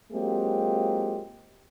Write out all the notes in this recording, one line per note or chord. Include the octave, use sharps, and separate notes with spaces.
F#3 G#3 A#3 C4 F4 G4